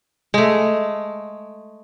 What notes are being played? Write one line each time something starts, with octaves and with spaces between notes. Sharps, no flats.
G#3 A3